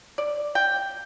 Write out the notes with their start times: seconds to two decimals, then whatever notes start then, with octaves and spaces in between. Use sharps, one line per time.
0.18 D5
0.55 G5